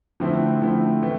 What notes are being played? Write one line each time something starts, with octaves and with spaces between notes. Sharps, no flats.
D3 F3 A3 C4 E4
D3 F3 A3 C4 E4
A2 E3 A3